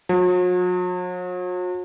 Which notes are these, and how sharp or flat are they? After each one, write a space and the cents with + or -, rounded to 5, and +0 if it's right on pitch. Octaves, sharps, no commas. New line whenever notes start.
F#3 -45